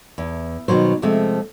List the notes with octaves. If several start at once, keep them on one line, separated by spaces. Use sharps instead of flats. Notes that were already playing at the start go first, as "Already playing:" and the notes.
E2
B2 D#3 F#3 C5
C3 F3 G#3 A3 C4